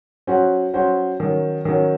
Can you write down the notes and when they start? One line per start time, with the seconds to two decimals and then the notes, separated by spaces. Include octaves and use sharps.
0.27 F#3 C#4 F#4 C5
0.74 F#3 C#4 F#4 C5
1.20 D#3 F#3 C#4
1.65 D#3 F#3 C#4